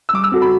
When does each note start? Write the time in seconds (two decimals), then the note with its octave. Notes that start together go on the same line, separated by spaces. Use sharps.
0.09 E6
0.14 G3 D6
0.24 E6
0.32 C4 F#4 A4
0.42 B5